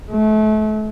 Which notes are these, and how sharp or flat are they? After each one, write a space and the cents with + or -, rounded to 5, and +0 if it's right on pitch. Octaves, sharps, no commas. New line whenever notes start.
A3 -35